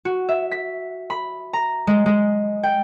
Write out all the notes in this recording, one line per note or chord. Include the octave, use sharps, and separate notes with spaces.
F#4
E5
B6
B5
A#5
G#3
G#3
G5